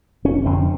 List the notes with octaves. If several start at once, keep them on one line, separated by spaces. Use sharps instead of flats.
F1 C#4
F2 D3 C4